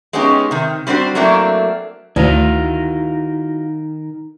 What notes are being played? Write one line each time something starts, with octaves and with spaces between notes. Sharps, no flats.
G#3 B3 C#4 D#4 G4
C3 D#3
G3 C4 D4 F#4 C5
F#3 A3 A#3 C4 D4 E4
D2 D#3 E4 F#4 F5